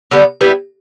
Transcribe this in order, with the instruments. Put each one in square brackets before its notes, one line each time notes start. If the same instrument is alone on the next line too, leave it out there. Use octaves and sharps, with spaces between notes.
[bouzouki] D3 G3 B3
G3 B3 E4